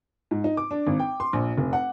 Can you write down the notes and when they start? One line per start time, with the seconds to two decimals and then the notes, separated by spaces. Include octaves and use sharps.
0.31 G#2
0.44 D#4
0.57 D6
0.71 D4
0.87 G#1
0.99 G5
1.20 C6
1.33 A#1
1.57 F1
1.73 F#5